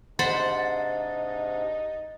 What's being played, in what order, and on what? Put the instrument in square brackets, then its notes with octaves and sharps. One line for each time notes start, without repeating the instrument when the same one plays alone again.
[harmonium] G#2 C3 D4 [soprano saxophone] D#4 [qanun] C5 F#5 B5 [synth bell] A6